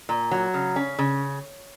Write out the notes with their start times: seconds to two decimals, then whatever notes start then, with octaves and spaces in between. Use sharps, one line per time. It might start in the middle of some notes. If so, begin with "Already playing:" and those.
0.09 A#2
0.31 F#3
0.54 C#3
0.76 C#4
0.99 C#3